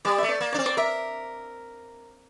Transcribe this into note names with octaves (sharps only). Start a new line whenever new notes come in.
G3 D5
A3 E5
D5
A#3
D4 D5
C4
D5
A#4 E5